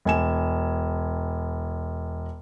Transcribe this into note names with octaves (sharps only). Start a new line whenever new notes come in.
E1 G#5 E7